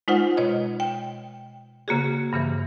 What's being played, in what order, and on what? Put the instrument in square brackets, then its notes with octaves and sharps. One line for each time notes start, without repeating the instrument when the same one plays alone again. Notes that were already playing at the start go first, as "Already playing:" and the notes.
[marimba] G#3 D#4 F4 C5 F#5
B2 C#5 D#5
G5
C#3 A#3 F#4 G#4
G2 C#3 E3